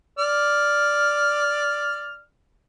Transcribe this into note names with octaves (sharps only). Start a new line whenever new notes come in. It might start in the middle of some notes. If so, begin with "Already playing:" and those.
D5 F6